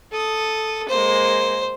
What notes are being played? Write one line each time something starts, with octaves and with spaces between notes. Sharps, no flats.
A4 D#6
G#3 A#3 C5